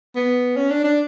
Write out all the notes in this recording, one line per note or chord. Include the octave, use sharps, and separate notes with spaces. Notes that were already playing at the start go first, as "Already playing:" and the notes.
B3
C#4
D4
D4